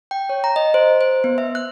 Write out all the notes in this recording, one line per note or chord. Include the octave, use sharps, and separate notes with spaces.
G5
C#5
A#5
D#5
C5
C5
B3
E5
F#6